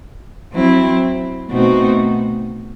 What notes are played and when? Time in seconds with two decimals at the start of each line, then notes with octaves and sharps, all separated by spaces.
0.53 F#3 C4 E4
1.51 B2 A3 C4 D#4 F#4